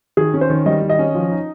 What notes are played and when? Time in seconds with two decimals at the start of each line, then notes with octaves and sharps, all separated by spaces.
0.17 D#3 G#4
0.34 C#4
0.41 C5
0.50 D#3
0.66 G3 D#5
0.82 D#3
0.90 D#5
0.99 C#4
1.15 F3
1.31 D#4